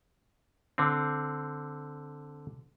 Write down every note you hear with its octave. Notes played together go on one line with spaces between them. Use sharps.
D3 C4